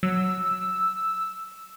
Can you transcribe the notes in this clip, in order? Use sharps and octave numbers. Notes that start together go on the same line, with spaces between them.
F#3 E6